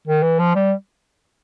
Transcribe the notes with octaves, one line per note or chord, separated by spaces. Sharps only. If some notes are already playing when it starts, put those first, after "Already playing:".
D#3
E3
F3
G3